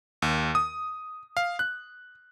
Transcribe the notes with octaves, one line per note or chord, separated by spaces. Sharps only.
D#2
D#6
F5
F#6